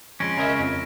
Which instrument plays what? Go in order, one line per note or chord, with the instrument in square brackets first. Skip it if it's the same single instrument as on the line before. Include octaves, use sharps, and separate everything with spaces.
[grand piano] F2 [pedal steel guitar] G#3 C#4 [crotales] A#6 D7
[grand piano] C#3 [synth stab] A#4 D#5 E5
[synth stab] F2